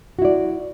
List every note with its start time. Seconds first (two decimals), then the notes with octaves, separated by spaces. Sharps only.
0.19 F#4
0.22 E4
0.25 D5